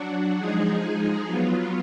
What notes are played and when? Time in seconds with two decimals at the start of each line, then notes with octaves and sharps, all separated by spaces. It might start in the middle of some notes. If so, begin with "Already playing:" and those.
Already playing: F#3 D4 F#4
0.38 F3 G#3 D#4 G#4
1.25 F#3 B3 F4